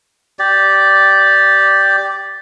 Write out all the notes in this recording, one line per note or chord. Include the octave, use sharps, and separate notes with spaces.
G4 D5